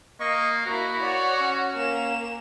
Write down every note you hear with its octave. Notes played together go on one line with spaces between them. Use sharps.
A#3 D#5 C#6
A#3 E4 F#4 A#5
C#5 D5 F#5
C#4
A#3 E7